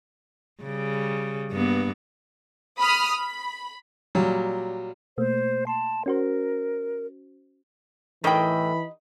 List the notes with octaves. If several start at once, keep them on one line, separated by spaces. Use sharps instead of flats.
C#3 G3
G2 A#3 B3
B5 D#6 F6
B5
A#2 F#3 G3
B2 A3 A#3 C5
A5 C6
C#4 F#4 A#4 C5
A2 D#3 E3 G4 D#5 G5 B5